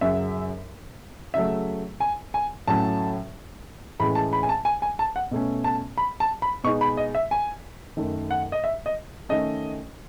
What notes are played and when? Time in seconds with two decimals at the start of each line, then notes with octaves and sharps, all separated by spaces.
0.01 F#2 C#3 F#3 E5
1.34 C#3 F#3 A3 E5
2.00 G#5
2.34 G#5
2.67 A2 F#3 A3 C#4 A5
4.00 A2 E3 G#3 C#4 B5
4.15 A5
4.33 B5
4.43 G#5
4.49 A5
4.65 G#5
4.82 G#5
4.99 A5
5.16 F#5
5.31 B2 A3 C#4
5.64 A5
5.98 B5
6.20 A5
6.42 B5
6.64 B2 G#3 B3 D#4 C#6
6.81 B5
6.97 D#5
7.15 E5
7.31 G#5
7.97 F#2 D#3 A3
8.31 F#5
8.52 D#5
8.64 E5
8.86 D#5
9.29 D#3 A3 C#4 D#5